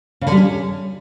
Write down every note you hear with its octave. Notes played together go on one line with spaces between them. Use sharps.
C#3
D3
G3
C#4